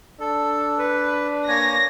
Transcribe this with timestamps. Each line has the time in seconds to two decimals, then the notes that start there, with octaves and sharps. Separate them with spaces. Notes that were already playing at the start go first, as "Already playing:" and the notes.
0.20 D4 A4
0.78 B4
1.48 A#3 C#5 G#5 A#6